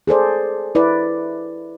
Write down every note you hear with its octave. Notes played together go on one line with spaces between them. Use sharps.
G#4 A4 C5 D5
E4 B4 D5